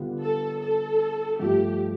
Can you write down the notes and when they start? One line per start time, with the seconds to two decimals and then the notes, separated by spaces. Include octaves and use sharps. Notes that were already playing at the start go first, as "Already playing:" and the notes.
Already playing: D3 G3 B3 F4
0.21 A4
0.61 A4
1.39 G2 F3 A3 G4